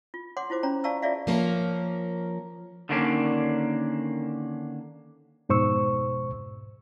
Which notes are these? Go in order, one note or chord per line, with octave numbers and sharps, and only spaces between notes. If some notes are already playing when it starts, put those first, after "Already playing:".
F4
C#5 F#5 C6 D6
E4 F4 C5 D6
C#4 C#5 A#5 B5
D5 F5 A5 A#5 C#6 E6
F4 G#4 C#5 D5 E5 F5
F3 A#3 C#4 A#4
D3 D#3 A#3 C#4 D4
F2 G#2 B2 C5 C#6 E6